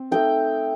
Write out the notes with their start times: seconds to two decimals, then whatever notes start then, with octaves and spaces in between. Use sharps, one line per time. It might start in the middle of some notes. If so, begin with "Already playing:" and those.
Already playing: C4
0.11 A3 D#4 G5